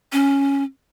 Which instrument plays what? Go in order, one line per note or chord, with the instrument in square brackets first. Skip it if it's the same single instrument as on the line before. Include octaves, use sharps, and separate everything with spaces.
[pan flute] C#4